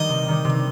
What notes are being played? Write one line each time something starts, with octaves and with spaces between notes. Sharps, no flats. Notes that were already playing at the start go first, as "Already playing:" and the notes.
Already playing: D#3 G3 D#5
C3
D#3 G3
C3